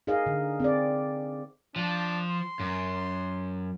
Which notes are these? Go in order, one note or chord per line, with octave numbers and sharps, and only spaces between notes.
D#4 G#4 A#4 D#5 F5
D3
C4 G#4 D5
F3 D4
C6
F#2